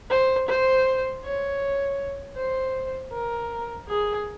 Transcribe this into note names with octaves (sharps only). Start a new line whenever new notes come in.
C5
C5
C#5
C5
A#4
G#4